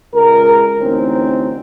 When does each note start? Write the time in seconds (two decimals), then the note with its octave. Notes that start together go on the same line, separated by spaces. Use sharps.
0.14 C#2 G#3 A#4
0.78 A1 D2 C4 C#4 D#4